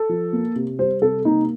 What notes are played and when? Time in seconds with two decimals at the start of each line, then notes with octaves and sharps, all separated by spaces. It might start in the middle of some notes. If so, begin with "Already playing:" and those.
Already playing: A4
0.09 F3
0.33 A#3
0.56 C3
0.79 G3 C5
1.02 C3 A4
1.25 A#3 D#4